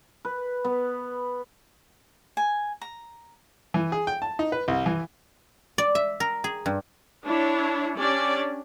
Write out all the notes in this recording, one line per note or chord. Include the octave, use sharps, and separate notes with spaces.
B4
B3
G#5
A#5
E3
G#4
G5
A5
D#4
B4
C2
E3
D5
E5
A#4
G#4
G2
D4 E4 C#5
C#4 D4 G4 D5